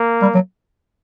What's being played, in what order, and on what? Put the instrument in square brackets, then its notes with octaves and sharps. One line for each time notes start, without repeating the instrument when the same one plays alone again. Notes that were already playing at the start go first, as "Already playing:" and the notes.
Already playing: [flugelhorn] A#3
[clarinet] G3
F#3